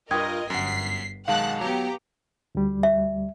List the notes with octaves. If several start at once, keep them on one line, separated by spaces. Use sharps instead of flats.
G2 F4 A#4 D#5 G5 D#6 G#6
G1 F#2 F#5 B6 C7
B1 D#3 G#3 F5 F#5 A5 F#6
F#3 B3 G4 A#5
D2 G3
E5